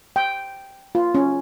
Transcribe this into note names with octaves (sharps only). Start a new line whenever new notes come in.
G5
F4
C#4